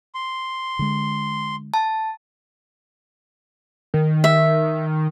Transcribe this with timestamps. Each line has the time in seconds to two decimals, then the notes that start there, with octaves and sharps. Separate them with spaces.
0.15 C6
0.79 D3 G#3
1.74 A5
3.94 D#3
4.24 E5